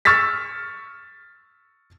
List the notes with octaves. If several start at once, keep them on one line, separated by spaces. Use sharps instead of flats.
C#6 E6 F6 A6 B6